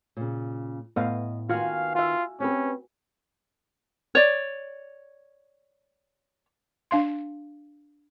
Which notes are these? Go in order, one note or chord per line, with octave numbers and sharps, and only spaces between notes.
A#2 C#3
A2 A3 B3 D#5 F5
D#3 B3 F4 F#4 F5 G#5 F6
F4 E5 F5
C4 C#4 G4 B4
C#5 D5
D4 F5 C6